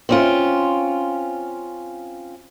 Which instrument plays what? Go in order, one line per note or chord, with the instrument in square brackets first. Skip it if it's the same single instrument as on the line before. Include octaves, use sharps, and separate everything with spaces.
[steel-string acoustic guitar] C4 C#4 F4